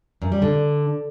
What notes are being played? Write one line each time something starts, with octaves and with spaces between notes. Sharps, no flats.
F#2
G3
D3